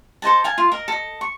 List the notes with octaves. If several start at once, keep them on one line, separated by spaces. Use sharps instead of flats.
A4 C5 D#5 A5
F5 G#5 A5
F4
A#4 D#5
A4 D#5
C#6